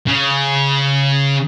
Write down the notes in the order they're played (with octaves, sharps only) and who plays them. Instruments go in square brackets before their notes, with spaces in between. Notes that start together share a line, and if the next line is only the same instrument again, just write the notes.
[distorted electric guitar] C#3